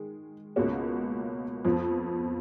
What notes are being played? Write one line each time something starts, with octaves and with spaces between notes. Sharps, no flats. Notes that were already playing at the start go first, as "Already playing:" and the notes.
Already playing: D#3 G#3
C#2 B2 A#3 C#4 F#4
F2 F3 B3